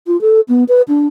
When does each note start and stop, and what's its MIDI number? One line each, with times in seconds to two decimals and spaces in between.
0.07 0.20 65
0.21 0.40 69
0.48 0.64 59
0.69 0.82 71
0.88 1.07 62